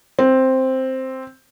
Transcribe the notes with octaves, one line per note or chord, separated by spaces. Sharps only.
C4